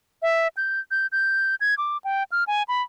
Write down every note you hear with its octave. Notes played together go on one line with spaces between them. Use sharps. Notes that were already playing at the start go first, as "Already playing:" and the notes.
E5
G6
G6
G6
G#6
D6
G5
F6
G#5
B5